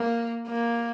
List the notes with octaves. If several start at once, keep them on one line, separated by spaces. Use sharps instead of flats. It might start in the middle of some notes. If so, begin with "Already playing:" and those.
Already playing: A#3
A#3